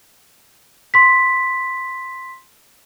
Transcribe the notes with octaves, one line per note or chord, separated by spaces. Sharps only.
C6 B6